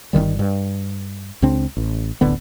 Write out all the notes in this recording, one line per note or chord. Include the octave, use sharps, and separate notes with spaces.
G1 D#2 D#3 G3
G2
C#2 C#3 C4 D4
A1
D1 A1 D3 B3